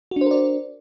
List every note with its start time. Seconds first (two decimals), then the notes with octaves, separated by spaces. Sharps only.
0.11 F#4
0.16 D4
0.21 C5
0.26 A#4
0.31 D5